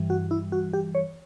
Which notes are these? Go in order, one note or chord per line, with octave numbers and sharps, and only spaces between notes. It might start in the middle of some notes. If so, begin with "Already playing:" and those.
Already playing: G2 E3 G3
F#4
E4
F#4
G4
C#5